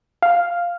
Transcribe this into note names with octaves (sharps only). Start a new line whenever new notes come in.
F5